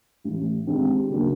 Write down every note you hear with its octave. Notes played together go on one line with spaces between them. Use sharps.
A1 A2 E3
G#1 G2 D#3 G#3 C4
C#3 F#3 A#3 D4